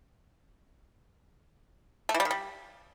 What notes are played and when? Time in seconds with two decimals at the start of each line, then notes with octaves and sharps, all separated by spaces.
2.09 A3
2.14 E3
2.20 G3
2.25 D#3
2.31 G3